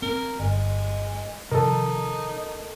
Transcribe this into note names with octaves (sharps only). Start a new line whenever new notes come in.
C4 A#4
G1 G#3
C3 D#3 F3 D#4 A4 A#4